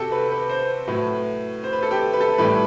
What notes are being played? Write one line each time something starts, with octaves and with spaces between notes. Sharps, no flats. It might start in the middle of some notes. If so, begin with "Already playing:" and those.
Already playing: C3 F#4 G4 A4
B4
B4
C5
A2 F#3 B4
C5
B4
A4
G4
B4
A4
A2 E3 G3 B4